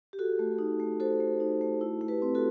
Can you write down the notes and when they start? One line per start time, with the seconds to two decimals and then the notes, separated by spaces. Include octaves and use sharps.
0.13 G4
0.19 F#4 A4
0.39 A3
0.59 D#4
0.80 A3
1.00 F#4 A4 C5
1.20 A3
1.40 D#4
1.61 A3
1.81 E4
2.01 A3
2.08 G4 B4
2.22 C4
2.35 F#4 A4